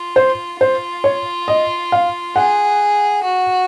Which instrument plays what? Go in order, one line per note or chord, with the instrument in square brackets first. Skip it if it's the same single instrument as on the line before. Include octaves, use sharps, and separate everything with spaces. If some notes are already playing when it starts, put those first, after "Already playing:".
Already playing: [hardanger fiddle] F4
[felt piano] C5
[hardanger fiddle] F4 [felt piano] C5
[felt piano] C#5
D#5
F5
[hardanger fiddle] G#4 [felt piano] F#5
[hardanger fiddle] F#4